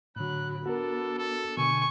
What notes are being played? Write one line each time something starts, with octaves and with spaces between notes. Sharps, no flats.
A2 D3 F#3 B5 F#6
B3 D4 F#4 A4 A#4
A4
B2 D3 G#5 C#6